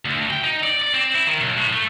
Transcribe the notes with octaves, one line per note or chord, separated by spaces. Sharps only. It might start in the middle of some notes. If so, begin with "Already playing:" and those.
D2
D2
G5
D#4
D5
D5
C4
E4
D#3
B1
A2
A3